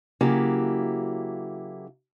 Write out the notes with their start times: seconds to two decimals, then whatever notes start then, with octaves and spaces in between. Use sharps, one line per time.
0.21 C#3 F#3 A#3 E4 G4